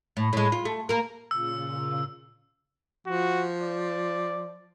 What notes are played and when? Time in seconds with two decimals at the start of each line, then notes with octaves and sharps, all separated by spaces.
0.17 A2
0.33 A2 G#3
0.52 F4
0.65 A3
0.89 A#3 A#4
1.31 A#2 C#3 F4 E6
3.07 F3 F#4
3.62 D5